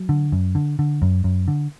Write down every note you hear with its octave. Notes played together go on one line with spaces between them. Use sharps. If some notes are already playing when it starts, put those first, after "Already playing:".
Already playing: F#3
D3
F#2
D3
D3
F#2
F#2
D3